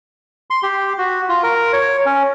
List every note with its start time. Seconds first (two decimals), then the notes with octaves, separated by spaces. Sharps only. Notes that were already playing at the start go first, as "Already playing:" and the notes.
0.50 C6
0.63 G4
0.98 F#4
1.29 F4
1.43 A#4
1.73 C#5
2.06 C#4